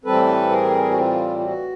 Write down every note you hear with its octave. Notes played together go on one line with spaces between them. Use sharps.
A2 E3 G3 C4 A4 B4
G#4 A#4
F#4
F4
F4
F#4